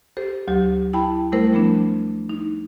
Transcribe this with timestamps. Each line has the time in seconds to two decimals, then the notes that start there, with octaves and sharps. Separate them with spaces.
0.17 G4 A4 C5
0.48 D2 F#3 G4
0.93 E4 G5 A5 B5
1.32 G3 A3 E4 A#4 C5
1.53 F3 A3 B3 D4
2.29 D#4